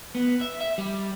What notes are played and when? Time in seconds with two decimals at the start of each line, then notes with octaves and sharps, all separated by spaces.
0.15 B3
0.41 E5
0.61 E5
0.78 G3